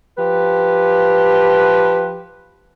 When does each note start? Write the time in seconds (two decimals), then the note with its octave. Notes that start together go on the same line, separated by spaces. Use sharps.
0.18 F3 G4 B4